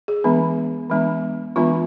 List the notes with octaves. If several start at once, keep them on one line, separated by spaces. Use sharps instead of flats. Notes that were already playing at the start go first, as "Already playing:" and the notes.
G#4
E3 G#3 B3 D4
E3 G#3 B3 D4
E3 G#3 B3 D4 F4